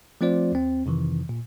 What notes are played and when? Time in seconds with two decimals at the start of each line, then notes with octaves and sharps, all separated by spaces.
0.21 F3 A3 C4 F4 C5 D5
0.52 D#2 C4
0.86 F2 C3 D#3 E3
1.29 A#2